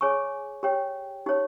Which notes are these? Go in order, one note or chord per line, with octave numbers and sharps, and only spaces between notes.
G#4 C#5 G#5 C#6
G4 C#5 G5
D#4 G4 C#5